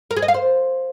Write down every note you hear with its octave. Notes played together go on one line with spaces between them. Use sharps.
A#4
G#4
D#5
F5
C5